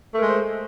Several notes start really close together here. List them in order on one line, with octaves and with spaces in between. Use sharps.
A3 A#4 G#3 C5